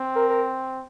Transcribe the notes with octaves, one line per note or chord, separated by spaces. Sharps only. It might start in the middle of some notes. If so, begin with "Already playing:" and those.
Already playing: C4
A#4
A#4